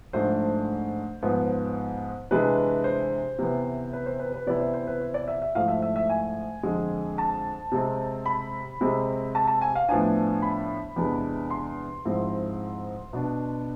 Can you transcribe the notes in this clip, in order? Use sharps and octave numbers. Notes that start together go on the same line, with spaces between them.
G#2 F3 A3 D4 C5
G#2 F3 B3
C3 E3 G#3 D4 B4
C5
C3 E3 B3
B4
C5
B4
B4
C3 E3 B3 E4 D5
C5
C5
B4
C5
D5
E5
E5
G#2 F3 A3 E4 F5
E5
E5
E5
G#5
F2 D3 G#3 C4
A5
C3 G#3 C4
B5
C3 G#3 C4
A5
A5
G#5
F5
A2 F3 B3 D4 G#5
B5
E2 C3 G#3 B3 D4
C6
G#2 F3 G#3 C4 E4
B2 B3 D4